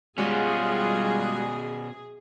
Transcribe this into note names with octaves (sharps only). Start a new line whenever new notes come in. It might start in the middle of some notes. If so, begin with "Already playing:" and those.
B2 G3 G#3 C#4 F4 F#4 G#4